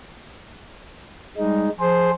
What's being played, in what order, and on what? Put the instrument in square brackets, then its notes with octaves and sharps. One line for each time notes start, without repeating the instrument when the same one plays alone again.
[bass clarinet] G3 [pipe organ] G#3 D#4
[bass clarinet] F3 [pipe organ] G#4 C5